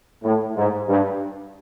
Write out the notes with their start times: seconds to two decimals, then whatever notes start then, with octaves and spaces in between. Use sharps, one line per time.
0.23 A2
0.56 G#2
0.88 G2